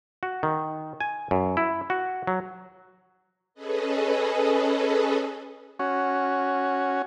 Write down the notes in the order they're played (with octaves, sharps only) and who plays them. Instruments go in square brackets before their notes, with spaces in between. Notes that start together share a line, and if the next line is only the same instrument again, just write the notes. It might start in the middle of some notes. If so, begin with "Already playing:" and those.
[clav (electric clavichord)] F#4
D#3
G#5
F#2
E4
F#4
F#3
[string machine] C#4 G#4 A4 B4 D#5
[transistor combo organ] C#4 F#4